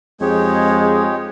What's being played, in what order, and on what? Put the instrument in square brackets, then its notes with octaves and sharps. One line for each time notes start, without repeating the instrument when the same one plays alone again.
[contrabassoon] F2 [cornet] G#3 [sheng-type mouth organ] D#4 G4 C#5 [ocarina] G#4